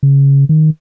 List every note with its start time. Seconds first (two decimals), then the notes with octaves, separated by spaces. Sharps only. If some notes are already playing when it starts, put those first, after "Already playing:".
0.03 C#3
0.49 D#3